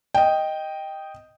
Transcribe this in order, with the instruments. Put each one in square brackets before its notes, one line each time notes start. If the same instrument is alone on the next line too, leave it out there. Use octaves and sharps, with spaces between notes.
[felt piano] D#5 G5